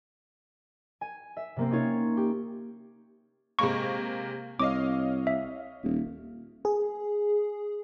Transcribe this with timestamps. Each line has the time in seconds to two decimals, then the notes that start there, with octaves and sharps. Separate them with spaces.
1.01 G#5
1.37 E5
1.56 C3 A#3 C4
1.71 C#4 D#4 F4 C#5
2.17 G4
3.59 C3 G#3 A#3 C#6
4.59 C2 C#5 D#5 F5 D6
5.27 E5
5.83 D#1
6.65 G#4